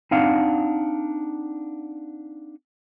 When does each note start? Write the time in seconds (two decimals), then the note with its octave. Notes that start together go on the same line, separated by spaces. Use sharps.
0.11 C4 D4 D#4 F5 F#5